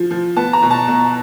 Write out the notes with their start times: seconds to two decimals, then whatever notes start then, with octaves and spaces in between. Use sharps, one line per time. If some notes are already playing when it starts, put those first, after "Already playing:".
Already playing: F3
0.11 F3
0.36 B3 A5
0.53 A#5
0.62 B2
0.71 A5
0.88 B2